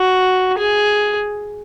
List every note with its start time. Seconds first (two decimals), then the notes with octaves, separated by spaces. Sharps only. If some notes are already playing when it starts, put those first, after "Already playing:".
Already playing: F#4
0.58 G#4